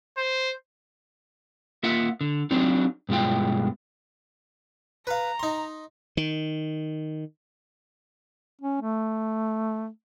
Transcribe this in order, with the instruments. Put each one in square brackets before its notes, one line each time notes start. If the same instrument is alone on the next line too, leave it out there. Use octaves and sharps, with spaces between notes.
[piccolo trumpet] C5
[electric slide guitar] A#3 F4 E5 F#5
D3
F#3 C4 D4 D#4
G2 B2 G#3 F4 G5
[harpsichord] B4 F5 [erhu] A#5
[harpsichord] D#4 C6
[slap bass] D#3
[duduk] C#4
A3